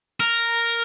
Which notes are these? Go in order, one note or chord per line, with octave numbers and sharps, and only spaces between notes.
A#4